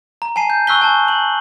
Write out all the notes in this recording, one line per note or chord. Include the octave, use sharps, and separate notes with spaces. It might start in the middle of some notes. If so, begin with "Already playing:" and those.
A#5
G#5 A5 C7 D#7
G6
G#5 C#6 E6 F#6 B6 G7
G#5 A5 C#6
G#5 F#7